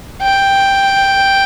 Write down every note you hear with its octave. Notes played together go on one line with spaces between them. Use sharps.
G5